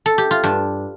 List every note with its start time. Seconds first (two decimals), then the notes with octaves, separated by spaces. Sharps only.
0.06 A4
0.18 G4
0.31 F4
0.43 G2 D4